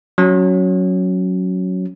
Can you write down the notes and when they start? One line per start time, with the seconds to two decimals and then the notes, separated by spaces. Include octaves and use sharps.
0.18 F#3 C#4